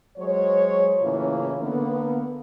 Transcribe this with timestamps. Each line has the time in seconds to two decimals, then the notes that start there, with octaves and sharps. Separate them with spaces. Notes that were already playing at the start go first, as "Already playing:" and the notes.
0.17 F#3 G#3 C5 C#5
1.01 A2 C#3 E3 A#3 C#4 F4
1.60 D3 A#3 B3